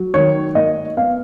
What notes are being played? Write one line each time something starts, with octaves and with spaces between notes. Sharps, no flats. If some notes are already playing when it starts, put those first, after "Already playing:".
Already playing: F#3
D#3 C#5
A#3 D#5
B3 F5